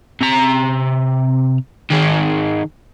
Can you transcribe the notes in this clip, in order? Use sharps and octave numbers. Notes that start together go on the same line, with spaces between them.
C3 A#5
D#3 G#4